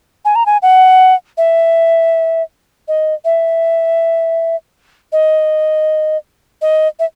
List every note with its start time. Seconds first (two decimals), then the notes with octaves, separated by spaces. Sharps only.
0.25 G#5
0.36 A#5
0.46 G#5
0.62 F#5
1.38 E5
2.88 D#5
3.25 E5
5.12 D#5
6.62 D#5
6.99 E5